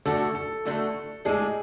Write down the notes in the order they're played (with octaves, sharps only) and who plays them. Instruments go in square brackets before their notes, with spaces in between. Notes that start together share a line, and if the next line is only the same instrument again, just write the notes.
[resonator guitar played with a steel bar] D3 A3 D4 F#4 [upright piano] A4
[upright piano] A4
[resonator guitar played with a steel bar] D3 A3 D4 F#4
[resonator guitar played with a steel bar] A2 G#3 D4 [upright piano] G#4